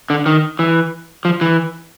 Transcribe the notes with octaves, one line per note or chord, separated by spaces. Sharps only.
D3
D#3
E3
F3
E3